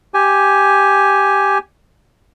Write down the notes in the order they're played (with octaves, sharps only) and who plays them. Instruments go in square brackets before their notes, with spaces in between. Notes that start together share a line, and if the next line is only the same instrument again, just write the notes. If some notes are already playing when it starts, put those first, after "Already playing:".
[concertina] G4 G#5